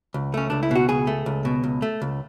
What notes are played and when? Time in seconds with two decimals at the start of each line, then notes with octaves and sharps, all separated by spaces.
0.14 C#2
0.34 A3 C#4
0.50 C#2 D4
0.63 E4
0.71 B2 F#4
0.89 C#2 G#4
1.07 A3
1.26 C#2
1.45 B2
1.64 C#2
1.82 A3
2.02 C#2